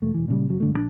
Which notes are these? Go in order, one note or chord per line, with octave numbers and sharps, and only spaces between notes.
E1 A3
E1 E3
A#2 C#3 G3
F#1 C#3 F#3
G2 D3 A3
A#1 C#3 D4